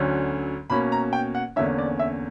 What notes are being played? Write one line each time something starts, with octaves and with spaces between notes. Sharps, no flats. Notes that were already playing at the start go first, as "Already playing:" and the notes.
Already playing: D2 D3 F#3 C#4
B2 A#3 C#4 B5
A#5
G5
F#5
E2 D3 A#3 C#4 E5
D5
E5